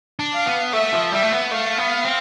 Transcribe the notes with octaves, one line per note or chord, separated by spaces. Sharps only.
D4
F5
B3
A3 E5
F3
G3 E5
A3
B3
A3 F5
B3
C4